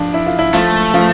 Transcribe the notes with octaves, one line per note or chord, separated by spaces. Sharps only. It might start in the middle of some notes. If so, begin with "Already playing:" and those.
Already playing: F3 D4 F4
E4
F4
E4
F3 A3 F4
F3 F4